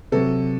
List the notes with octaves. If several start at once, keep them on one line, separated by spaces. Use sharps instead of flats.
C3 F#3 A4